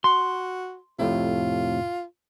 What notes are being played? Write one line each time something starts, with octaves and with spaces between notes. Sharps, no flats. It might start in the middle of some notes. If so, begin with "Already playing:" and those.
F#4 C6
F2 A2 C3 F4